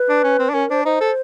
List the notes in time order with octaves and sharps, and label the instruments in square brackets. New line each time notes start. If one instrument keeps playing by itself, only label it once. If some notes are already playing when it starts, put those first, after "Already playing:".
Already playing: [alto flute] B4
[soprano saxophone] D4
C#4
C4
D4
[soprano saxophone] C#4 [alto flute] A#4
[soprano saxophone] D4 [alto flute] C5
[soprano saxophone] D#4 [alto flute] C5
[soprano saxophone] A4